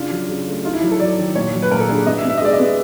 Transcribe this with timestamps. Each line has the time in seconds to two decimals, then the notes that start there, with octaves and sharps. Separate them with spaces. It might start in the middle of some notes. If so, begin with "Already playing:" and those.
Already playing: C#3 D4 F4
0.11 F#3
0.29 C#3
0.47 A3
0.65 D#4 F4
0.74 E4
0.82 F#3
0.91 A4
1.00 F#3 D5
1.18 D#3
1.35 A#2 C#5
1.53 F#3
1.62 B4
1.70 A#2 A#4
1.80 A4
1.89 D4 G#4
2.06 B3 D#5
2.18 E5
2.24 B3
2.30 E5
2.38 D#5
2.41 G#3 D5
2.53 D#5
2.59 B3